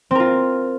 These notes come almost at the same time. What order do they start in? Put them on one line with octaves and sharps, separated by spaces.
C4 A#4 F4